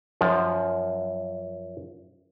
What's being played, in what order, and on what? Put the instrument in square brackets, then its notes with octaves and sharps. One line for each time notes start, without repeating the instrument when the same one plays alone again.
[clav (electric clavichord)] F#2 F3